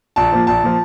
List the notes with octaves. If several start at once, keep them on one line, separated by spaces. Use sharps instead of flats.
A#1 A5
A#2 F3
A#1 A5
A#2 F3